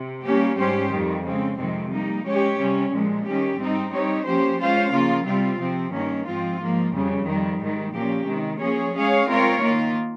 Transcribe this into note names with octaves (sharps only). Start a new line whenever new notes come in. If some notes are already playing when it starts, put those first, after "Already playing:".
Already playing: C3
G3 A#3 C#4 G4
G#2 G3 C#4 G4 C5
F2 D#3 G3
C#3 G#3 C4
F2 C3 D#3 G#3 C4
G3 A#3 D#4
G#3 C#4 G4 C#5
C3 G3 C#4
A#2 F3 G#3
D#3 G3 C#4 G4
G#2 G3 C4 D#4
G3 C4 D#4 G4 C#5
F3 A#3 C#4 G4 C5
G#3 C#4 F4 C5 F5
C#3 F3 A#3 F4
C3 G3 C4 F4
C3 F3 C4
G2 D#3 A#3 C#4
G#2 F3 C4 F4
G#2 F3 A#3
F2 C#3 G3
F2 D#3 G3
G#2 D#3 G3
A#2 F3 A#3 C#4 G4
C3 D#3 G#3
F3 A#3 C#4 G#4 C#5
G#3 C#4 G#4 C#5 F5
G#3 C4 F4 A#4 C#5
D#3 A#3 F4